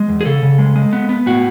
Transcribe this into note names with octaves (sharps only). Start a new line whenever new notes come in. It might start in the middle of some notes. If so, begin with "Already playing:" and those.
Already playing: G#3
E2
G#4
C#3 A4
C#3
G#3
G#3
B3
B3
A2 F#4